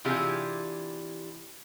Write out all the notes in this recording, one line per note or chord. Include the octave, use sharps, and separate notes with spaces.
C3 E3 D4 F4 G4 G#4